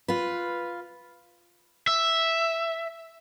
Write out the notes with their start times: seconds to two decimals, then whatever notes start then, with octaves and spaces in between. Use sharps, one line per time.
0.08 F4 B4
1.88 E5